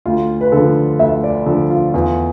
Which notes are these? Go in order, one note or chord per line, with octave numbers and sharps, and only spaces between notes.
D2 F4
B4
D3 A4
F3
D2 E5
D5
D3 F3 A4
F4
E2 F4